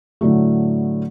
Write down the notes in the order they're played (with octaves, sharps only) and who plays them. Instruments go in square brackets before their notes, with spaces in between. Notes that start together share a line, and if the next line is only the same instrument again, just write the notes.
[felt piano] A2 D3 F#3 A3